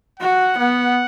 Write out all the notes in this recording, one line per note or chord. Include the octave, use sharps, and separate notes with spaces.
F#4 F#5
B3